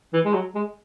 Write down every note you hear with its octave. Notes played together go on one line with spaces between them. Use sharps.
E3
G#3
F#3
G#3